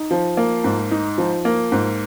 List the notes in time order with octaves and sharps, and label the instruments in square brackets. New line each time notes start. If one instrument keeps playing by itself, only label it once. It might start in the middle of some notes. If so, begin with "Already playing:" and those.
Already playing: [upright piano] D#4
F3
A#3
G#2
D#4
F3
A#3
G#2